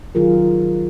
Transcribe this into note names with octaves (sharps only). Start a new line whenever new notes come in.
D#3 F#3 F4 G#4 A#4